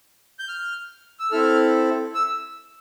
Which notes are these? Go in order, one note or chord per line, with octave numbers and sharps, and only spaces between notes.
G6
F6
E6
C4 E4 A4 F6
E6